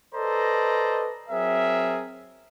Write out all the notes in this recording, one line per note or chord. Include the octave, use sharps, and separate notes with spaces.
A4 B4 C5 D5 D#5 A#5
F#3 C4 G#4 A#4 E5